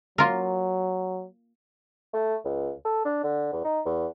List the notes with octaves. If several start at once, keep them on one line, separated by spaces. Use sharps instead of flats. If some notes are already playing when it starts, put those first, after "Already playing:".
F#3 A#3 F4 A#4
A3
C#2
A4
D4
D3
E2
D#4
E2